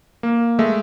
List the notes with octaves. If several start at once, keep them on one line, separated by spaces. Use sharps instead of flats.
A#3
G#3 A3 E5